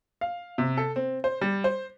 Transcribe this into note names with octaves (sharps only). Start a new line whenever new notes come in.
F5
C3
A4
C4
C5
G3
C5